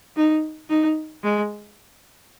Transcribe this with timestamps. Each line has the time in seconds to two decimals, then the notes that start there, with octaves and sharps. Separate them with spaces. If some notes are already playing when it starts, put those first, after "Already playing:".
0.16 D#4
0.70 D#4
1.23 G#3